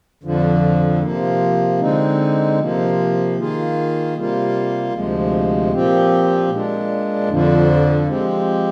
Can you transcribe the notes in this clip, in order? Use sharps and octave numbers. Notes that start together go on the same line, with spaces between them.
F2 D3 F3
C3 F3 A#3
D3 G#3 C4 D#4
C3 F3 A#3
D#3 A#3 F4 G#4
C3 G3 A#3 F4
D2 C3 F3 G#3
A#2 F3 C4 G4
A#2 G#3 D4
F2 D3 F3
F3 G#3 C4 G4